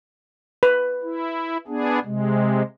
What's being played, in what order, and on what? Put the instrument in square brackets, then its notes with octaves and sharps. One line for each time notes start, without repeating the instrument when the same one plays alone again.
[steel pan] B4
[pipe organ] E4
B3 D4 G#4
C3 G#3